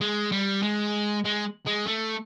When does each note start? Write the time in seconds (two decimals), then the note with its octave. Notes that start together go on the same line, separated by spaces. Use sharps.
0.01 G#3
0.32 G3
0.62 G#3
1.25 G#3
1.66 G#3
1.86 A3